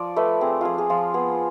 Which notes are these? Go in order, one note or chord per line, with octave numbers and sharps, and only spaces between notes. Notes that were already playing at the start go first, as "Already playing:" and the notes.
Already playing: F3 D5
A3 B4
C4 G#4
F3 F4 G#4
G#4
F3 F4
B3 G#4